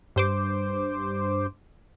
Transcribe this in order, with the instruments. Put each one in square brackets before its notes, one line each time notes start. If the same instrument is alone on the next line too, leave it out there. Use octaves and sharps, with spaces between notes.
[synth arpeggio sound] G2 C5 D6